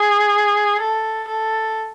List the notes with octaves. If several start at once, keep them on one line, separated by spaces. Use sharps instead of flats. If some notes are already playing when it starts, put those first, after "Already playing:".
Already playing: G#4
A4
A4